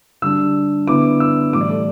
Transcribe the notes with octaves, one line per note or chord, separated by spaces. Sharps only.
D3 G3 D4 E6
D3 B3 E4 D6
E6
A2 E3 G3 E4 D6
D5
A4